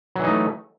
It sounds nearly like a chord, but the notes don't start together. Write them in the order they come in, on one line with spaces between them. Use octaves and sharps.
F#3 E3 D#4 A3